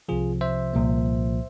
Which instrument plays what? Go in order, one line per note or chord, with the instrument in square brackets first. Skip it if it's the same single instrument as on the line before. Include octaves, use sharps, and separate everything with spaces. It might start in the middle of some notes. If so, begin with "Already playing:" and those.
[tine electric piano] C2 C3 F3 F4 G#4
C5 E5
C2 A#2 F3 A#3